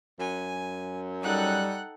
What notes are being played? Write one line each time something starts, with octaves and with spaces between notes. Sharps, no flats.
F#2 G#5
G3 D#4 A4 F#5 G5 F#6